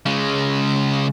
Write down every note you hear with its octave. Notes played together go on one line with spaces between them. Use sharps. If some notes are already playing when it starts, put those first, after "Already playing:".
C#3 G#3